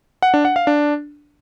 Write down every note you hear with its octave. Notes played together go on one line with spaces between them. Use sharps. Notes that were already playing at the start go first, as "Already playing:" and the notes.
F#5
D4
F#5
F5
D4